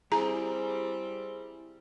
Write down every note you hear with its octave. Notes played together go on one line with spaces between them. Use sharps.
G3 C4 E4 G#4 A#5